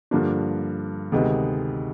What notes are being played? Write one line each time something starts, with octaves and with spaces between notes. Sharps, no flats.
G2 D3 F3 A#3 D4
D2 C3 D#3 G#3 B3